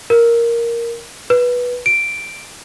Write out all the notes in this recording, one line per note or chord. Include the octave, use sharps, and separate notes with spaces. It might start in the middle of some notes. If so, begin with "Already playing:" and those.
A#4
B4
D7